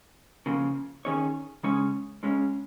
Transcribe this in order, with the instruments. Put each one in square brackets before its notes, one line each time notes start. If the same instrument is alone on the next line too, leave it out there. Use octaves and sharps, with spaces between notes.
[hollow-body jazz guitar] C#3 F3 A#3
D#3 C#4 G#4 C#5
C#3 G#3 C#4 G#4 C#5
C#2 C#3 G#3 C#4